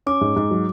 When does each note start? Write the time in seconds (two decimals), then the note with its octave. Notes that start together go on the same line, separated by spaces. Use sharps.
0.06 C#4 D6
0.21 G#2
0.36 G#2
0.51 F#3